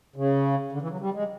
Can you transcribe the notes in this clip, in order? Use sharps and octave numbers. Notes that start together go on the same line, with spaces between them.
C#3
D3
E3
F#3
G3
G#3